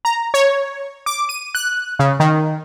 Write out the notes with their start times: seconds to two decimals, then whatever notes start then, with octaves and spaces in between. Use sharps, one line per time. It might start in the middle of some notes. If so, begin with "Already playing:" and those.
0.05 A#5
0.34 C#5
1.06 D6
1.29 D#7
1.55 F#6
1.99 C#3
2.20 D#3